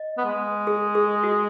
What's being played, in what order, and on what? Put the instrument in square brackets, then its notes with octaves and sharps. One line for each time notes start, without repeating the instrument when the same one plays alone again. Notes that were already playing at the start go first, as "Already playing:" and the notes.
Already playing: [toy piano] D#5
[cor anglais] B3
G#3
[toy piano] G#4
G#4
F#4